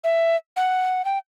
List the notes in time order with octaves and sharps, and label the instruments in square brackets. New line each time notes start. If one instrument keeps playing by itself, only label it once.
[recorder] E5
F#5
G5